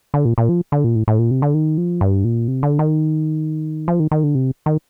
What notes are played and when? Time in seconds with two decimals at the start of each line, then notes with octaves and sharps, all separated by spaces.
0.14 D3
0.25 A#2
0.38 A#2
0.49 F3
0.72 D3
0.84 A#2
0.96 A2
1.08 A2
1.19 A#2
1.31 C3
1.42 D3
1.54 D#3
1.78 F3
2.01 G2
2.24 A#2
2.48 C3
2.63 D3
2.79 D#3
3.88 F3
4.00 D#3
4.11 D#3
4.24 D3
4.35 C3
4.66 D#3